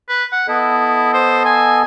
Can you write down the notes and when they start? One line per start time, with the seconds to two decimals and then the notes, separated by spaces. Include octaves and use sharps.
0.09 B4
0.32 F#5
0.48 B3 E4 A4 D#5
1.14 C5
1.46 G#5